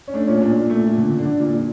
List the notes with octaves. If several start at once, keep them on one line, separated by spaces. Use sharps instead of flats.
C#4
A3 D4
A#2 C#4
A#2 D4
A#2
A3
A#2
D3
D3
D4
D3
A#2
A#2